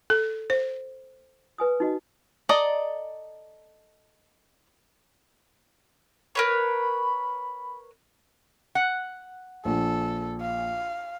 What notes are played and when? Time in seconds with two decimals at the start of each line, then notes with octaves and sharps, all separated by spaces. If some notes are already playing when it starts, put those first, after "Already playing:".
0.10 A4
0.50 C5
1.58 B4 G#5 D#6
1.80 D#4 F#4 D#5
2.49 A4 D5 D#5 A#5
6.35 A#4 B4 C#5 B5
8.75 F#5
9.65 A#1 A4
10.41 F5